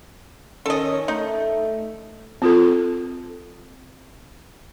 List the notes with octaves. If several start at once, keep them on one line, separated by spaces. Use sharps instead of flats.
D#3 C#4 A4 D#5
A3 D#4
C4 F4 A4